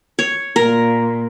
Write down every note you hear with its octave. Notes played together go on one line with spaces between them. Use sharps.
C#5
A#2 A#4